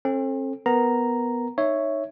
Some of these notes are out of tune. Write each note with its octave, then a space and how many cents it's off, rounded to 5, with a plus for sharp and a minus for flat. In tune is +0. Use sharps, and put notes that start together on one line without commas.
C4 +40 A4 +0
B3 +0 A#4 +0 A#5 +0
D#4 -15 C#5 +0 E5 +0